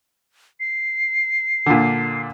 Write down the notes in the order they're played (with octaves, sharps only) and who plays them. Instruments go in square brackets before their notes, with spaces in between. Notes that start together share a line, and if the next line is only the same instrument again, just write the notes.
[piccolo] C7
[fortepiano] A#2 D3